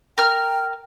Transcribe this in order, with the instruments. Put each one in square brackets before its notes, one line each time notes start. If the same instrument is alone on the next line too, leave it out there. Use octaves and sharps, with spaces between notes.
[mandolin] A#4 F6 [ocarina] G5